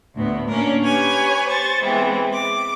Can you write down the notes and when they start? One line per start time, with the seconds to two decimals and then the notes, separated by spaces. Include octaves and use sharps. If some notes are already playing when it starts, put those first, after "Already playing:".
0.14 D2 A2 B3
0.48 A#3 C#4 D4 A#4
0.82 G4 B4 C#5 G#5
1.46 C5 C#6 A6
1.81 E3 G#3 B3 C4
2.33 D6